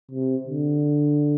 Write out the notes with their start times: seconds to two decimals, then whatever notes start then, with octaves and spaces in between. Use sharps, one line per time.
0.11 C3
0.47 D3